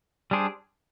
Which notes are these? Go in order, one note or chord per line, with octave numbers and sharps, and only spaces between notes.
G3 D4 G#4 C5